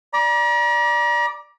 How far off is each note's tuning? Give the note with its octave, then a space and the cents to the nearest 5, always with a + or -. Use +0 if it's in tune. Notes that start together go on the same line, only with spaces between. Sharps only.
D5 +0 A#5 +40